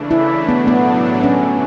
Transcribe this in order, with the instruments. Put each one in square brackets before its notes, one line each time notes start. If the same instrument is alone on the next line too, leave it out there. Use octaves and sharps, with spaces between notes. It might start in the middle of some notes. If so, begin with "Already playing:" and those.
Already playing: [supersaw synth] C#3 E3 A3 D4
[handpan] E4
[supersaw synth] A2 F#3 A3 D4 [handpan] B3
[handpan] B3
[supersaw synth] G2 D3 F#3 [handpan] C#4